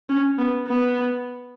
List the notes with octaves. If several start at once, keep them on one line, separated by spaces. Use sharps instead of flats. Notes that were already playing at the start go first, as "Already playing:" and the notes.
C#4
B3
B3